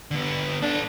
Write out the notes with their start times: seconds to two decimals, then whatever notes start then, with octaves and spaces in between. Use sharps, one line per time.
0.11 D3 B3
0.62 B3 D4 A4